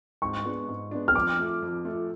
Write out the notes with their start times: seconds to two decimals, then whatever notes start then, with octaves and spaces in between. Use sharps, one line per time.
0.22 G#2 C#6
0.45 G#3 B3 D4
0.68 G#2
0.91 G#3 B3 D4
1.08 F6
1.15 F2 D6
1.39 F3 A3
1.62 F2
1.85 F3 A3